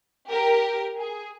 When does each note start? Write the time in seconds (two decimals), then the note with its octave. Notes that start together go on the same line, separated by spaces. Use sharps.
0.29 G4 A#4
0.98 G#4